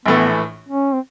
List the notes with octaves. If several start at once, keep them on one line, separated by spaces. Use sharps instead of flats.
A#1 A2 E3 A3 B3
C#4
C4